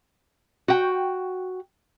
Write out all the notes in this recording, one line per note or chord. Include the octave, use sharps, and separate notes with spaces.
F#4 G5